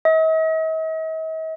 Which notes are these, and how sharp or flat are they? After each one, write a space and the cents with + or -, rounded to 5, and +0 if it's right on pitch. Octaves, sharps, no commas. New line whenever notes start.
D#5 +45